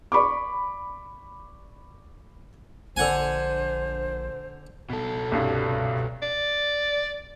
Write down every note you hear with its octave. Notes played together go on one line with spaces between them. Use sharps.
D5 B5 C#6 D6
A#1 D3 C5 F#5 G#5
B2 A4
C2 G2
D5